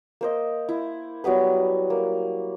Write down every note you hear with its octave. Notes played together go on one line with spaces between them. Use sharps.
A#3 C5 D#5
E4
F#3 G3 B3 B4
A#3